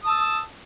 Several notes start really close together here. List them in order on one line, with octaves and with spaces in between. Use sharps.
D#6 A5 E6